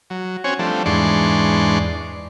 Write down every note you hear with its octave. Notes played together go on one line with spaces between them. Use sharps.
F#3
C4 C#4 F#4 C#5 G#5
F3 G3 A3 C4 D4
E2 G#2 D4 D5 C6 C#6